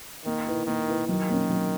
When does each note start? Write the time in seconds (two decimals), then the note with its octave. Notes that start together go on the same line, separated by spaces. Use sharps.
0.25 D#3 A#3
0.47 E4 B4
0.67 D#3 A#3
0.88 E4 B4
1.08 D#3 F#3
1.29 A#3 C#4
1.49 F#3